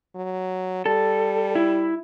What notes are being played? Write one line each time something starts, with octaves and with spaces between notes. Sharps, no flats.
F#3
G3 A4
E4